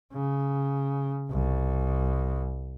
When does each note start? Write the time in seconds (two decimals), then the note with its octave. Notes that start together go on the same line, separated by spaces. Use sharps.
0.13 C#3
1.30 C2